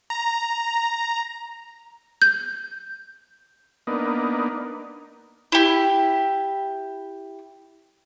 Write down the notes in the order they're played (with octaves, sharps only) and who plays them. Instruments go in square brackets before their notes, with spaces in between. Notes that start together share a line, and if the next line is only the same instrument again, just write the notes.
[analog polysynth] A#5
[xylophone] G6
[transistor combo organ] A#3 B3 D4 D#4
[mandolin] E4 G4